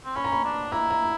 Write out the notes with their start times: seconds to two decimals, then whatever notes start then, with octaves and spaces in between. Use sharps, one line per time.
0.05 C4
0.16 C#4 B5
0.25 A#5
0.32 B5
0.45 D4
0.72 E4 A#5
0.91 A#5